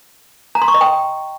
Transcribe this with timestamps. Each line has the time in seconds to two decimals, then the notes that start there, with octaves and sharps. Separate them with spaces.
0.55 A#5
0.62 C6
0.68 C#6
0.74 D#5
0.81 G5